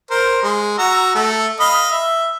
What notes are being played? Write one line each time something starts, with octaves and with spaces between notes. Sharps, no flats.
A#4 C5
G#3
F#4 A#5 E6
A3
D#5 F5 B5
E5